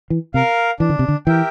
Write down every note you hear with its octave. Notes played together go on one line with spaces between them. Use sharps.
E3
C3 A#4 F5
E3 D4
D3
C3
D3
E3 G4 A#4 E5 G5